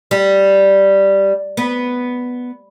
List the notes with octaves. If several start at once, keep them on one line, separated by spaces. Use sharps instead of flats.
G3
B3